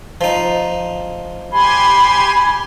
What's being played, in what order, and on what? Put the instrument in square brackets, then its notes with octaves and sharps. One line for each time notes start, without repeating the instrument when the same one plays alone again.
[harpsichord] F3 D#4
[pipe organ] G4 G#5 C6 [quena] B5